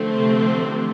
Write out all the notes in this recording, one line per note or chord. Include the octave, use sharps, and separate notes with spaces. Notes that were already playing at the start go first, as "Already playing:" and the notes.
Already playing: D3 F3 A3 C4
C3